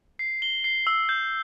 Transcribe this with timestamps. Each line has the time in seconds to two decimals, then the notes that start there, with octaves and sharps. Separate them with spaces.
0.19 C7
0.42 G7
0.64 C7
0.87 E6
1.09 G6